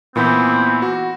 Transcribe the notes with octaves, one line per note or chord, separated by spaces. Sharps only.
A#2 E3 B3 C4 B5
F#4